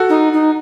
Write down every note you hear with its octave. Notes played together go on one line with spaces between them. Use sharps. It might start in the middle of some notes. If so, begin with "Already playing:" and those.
Already playing: F#4 A4
D#4
D#4